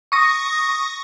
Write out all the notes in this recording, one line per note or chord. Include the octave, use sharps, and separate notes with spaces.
C#6 D#6 A#6